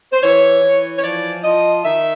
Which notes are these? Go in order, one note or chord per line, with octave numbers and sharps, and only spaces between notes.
C5
E3 C#5
E3
C#5
F3 D5
F3 D#5
D#3 E5